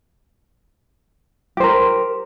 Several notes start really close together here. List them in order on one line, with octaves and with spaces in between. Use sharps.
G4 C5 A#4